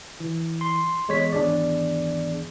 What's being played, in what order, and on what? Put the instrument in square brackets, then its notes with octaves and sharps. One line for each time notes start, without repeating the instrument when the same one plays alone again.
[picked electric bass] E3
[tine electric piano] C6
[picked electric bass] E2 [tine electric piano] G#3 C#5 B6
[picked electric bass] G#1 E2 [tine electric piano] D4 G#4 D5